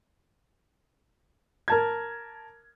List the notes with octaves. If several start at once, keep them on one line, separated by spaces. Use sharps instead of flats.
A#4 A5 G#6